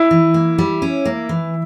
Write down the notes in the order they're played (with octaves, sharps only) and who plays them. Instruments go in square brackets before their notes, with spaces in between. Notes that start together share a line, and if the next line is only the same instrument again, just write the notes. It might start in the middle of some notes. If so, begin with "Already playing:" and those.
Already playing: [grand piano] E4
[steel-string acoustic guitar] E3
A#3
G3
C#4
A#3
E3